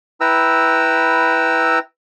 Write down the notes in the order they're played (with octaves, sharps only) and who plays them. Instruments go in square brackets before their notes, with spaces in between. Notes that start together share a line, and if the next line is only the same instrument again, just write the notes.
[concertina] E4 B4 G5 A#5 E6